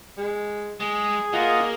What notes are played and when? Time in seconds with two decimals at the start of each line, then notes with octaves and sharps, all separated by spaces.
0.18 G#3
0.80 G#3 G#4
1.33 A#3 F4 D#5 F#5